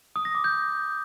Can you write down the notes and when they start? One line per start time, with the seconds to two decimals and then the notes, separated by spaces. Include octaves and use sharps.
0.16 D#6
0.25 A#6
0.35 D6
0.44 G6